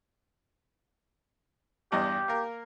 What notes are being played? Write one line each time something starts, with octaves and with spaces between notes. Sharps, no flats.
E2 G2 G4 D#5
A#3 A#4